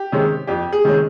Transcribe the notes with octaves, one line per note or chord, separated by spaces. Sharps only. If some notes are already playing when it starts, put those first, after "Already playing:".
Already playing: G4
C3 D#3 G#3 C#4
F2 G4
G#4
C3 D#3 G#3 C#4